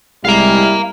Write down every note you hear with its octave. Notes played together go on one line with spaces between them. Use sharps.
C2 G3 G#3 E4 F5 A#5